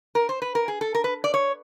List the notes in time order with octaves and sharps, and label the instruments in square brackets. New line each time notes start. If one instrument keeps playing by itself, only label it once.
[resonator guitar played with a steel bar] A#4
C5
B4
A#4
G#4
A4
A#4
B4
D5
C#5